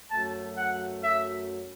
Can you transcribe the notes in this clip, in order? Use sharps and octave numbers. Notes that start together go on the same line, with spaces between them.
F#2 F#3 A3 A5
F#5
E5